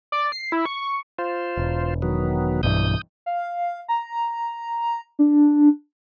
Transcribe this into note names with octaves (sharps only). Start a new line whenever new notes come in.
D5
C7
E4
C#6
F4 C5
E1
D#3 F#3 B3
B1 G2 E3 D#6 G6
F5
A#5
D4